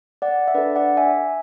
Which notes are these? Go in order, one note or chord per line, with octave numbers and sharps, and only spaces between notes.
D5 F#5
E5
D4 A4 B4 D5
D5 F#5
E5 G#5